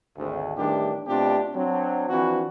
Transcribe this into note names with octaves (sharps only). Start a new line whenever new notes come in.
G#1 D2
E2 A2 D#3 G3 D4 G4
B2 A3 C4 D4 F4 G4
F#3 C4 D4
E3 F3 C4 D4 F#4